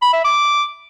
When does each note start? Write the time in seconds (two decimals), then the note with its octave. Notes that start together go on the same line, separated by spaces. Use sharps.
0.02 B5
0.13 E5
0.25 D6